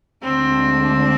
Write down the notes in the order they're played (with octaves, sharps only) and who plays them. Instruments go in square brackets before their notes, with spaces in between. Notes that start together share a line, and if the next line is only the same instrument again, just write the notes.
[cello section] D2 D3 G#3 D4 [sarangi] C4